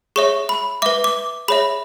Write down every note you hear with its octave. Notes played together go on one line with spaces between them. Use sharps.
G#4 C#5 E5 C#6
B5
B4 E5 D6
D6
G#4 C#5 E5 B5